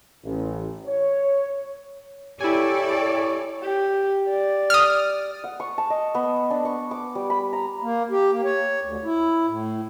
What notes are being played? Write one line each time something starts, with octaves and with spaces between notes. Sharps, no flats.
A1
C#5
E4 G4 A4 C#5 D5 G#5
G4
D5
D#6 F6
F#5
C#6
A5
D#5
B3
D4
C#6
D6
G3
B5
A#5
A#3
G4
A#3
C#5
D2
E4
A2